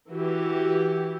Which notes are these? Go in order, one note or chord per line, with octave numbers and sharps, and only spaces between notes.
E3 F#4 G4